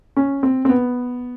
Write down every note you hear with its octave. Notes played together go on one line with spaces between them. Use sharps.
C#4
C4
C4
B3